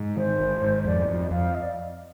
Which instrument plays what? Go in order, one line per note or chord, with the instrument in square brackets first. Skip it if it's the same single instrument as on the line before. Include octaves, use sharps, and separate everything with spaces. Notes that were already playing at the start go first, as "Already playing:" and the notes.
Already playing: [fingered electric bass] G#2
[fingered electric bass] D#3 [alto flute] C5
[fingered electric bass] G#1
G#2
[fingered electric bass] F2 [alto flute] D5
[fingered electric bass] F2
[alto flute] D#5
[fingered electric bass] F2 [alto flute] F5
[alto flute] D#5
D5